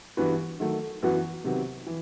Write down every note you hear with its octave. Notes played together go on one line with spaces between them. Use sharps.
G2 E3 B3 F#4 B4
D#3 F#3 A3
F#2 E3 B3 F#4 B4
C3 D#3 F#3 B3
E3